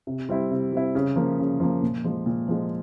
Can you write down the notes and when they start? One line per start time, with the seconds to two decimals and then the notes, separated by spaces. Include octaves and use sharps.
0.07 C3
0.29 G3 C4 E4
0.51 C3
0.72 G3 C4 E4
0.95 C#3
1.16 F3 A#3
1.39 C#3
1.60 F3 A#3
1.83 A#2
2.04 F3 G#3
2.26 A#2
2.48 F3 G#3